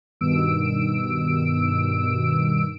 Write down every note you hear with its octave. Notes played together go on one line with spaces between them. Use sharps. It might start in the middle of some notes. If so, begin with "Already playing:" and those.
G2 B2 D#3 E6 D7